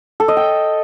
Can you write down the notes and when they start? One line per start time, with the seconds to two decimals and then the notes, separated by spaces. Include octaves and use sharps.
0.20 A4
0.28 D#5
0.37 G5